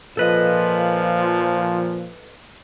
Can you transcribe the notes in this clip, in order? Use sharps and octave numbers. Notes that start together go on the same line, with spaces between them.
A#2 F3 A4 B4 D#5